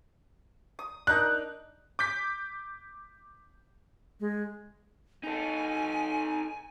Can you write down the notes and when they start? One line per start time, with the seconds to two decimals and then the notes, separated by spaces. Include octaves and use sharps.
0.79 D#6
1.07 D4 D#4 A#4 F#6
1.99 D6 G6 B6
4.20 G#3
5.23 D#4 A4 G#5